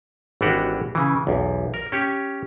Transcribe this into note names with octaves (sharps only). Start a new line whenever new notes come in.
G#1 E3 D4 F#4 G4 F#5
C#3 E3
B1 E2
A#4
C#4 G4 C#5